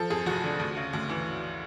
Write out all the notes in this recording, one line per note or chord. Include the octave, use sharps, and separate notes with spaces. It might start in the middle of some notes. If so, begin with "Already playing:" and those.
Already playing: F3 A4
F2 G#4
F1 F#4
D3
D2
C#3
D2
E3